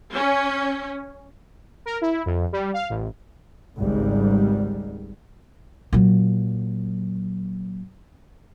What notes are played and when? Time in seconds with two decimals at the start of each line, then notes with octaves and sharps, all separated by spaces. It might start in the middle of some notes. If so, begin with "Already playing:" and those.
0.14 C#4
1.86 A#4
2.01 E4
2.26 F2
2.52 G3
2.73 F5
2.90 A1
3.79 G#1 C#2 G#2 G3
5.93 A#2 F#3